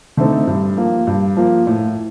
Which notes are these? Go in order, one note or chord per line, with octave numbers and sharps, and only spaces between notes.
D3 A3 C4 D#4
G2
F3 A#3
G2
F3 A#3
A2